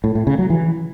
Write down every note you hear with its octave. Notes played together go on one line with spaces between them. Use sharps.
A2
A2
C#3
F#3
E3